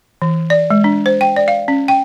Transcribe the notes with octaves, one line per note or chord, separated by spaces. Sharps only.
E3
D5
G#3
D4
C5
G5
D5
F5
C#4
G5